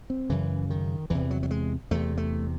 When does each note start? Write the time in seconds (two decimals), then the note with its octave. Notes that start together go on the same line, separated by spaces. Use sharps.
0.10 C4
0.30 F#2 C#3 E3
0.70 D#3
1.10 E2 C3 E3
1.31 F#3
1.43 F#3
1.51 G#3
1.91 E2 C3 A3
2.17 A3